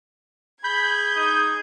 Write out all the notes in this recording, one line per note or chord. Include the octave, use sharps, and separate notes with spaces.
G#4 B5 G6 G#6
D#4 D#6